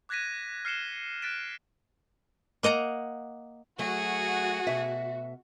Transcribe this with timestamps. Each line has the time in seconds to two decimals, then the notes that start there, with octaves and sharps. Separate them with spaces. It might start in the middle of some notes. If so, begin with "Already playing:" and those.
0.09 D6 F#6 G#6 A#6 B6 D#7
0.65 F6 C7 C#7 E7 G7
1.22 F#6 A6 B6 D7 E7
2.63 A#3 D#5 F#5 A#5
3.79 F#3 A3 F#4 G#4
4.67 B2 E5